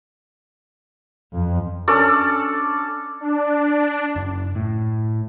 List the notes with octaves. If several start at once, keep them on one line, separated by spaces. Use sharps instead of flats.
F2
C#4 D4 A4 D5
D4
F#1
A2